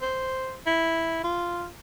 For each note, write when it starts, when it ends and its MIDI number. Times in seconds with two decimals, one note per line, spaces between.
0.01 0.56 72
0.66 1.20 64
1.24 1.67 65